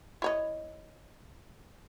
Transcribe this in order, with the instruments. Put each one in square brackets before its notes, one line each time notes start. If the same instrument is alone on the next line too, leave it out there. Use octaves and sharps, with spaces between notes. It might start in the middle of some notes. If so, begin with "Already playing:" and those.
[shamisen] E4 C#5 D#5